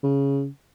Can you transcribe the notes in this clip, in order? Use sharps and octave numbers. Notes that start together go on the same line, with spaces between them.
C#3